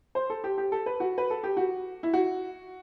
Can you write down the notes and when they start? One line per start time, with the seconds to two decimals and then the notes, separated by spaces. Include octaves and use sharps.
0.15 C5
0.30 A4
0.44 G4
0.58 G4
0.72 A4
0.86 B4
1.00 F#4
1.18 B4
1.30 A4
1.44 G4
1.57 F#4
2.03 E4
2.13 F#4